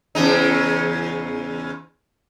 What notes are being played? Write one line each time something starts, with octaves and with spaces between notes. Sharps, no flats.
E2 C#3 D#4